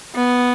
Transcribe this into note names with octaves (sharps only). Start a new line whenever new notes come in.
B3